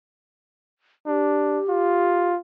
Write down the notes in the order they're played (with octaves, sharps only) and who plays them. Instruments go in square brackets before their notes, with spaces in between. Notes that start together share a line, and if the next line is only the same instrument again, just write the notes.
[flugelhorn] D4 [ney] G4
[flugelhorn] F4